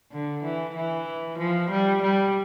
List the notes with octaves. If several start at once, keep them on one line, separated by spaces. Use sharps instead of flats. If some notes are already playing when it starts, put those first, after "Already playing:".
D3
E3
E3
F3
G3
G3